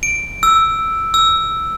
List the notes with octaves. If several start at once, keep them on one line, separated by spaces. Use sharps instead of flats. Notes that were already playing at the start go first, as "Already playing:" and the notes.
D7
E6
E6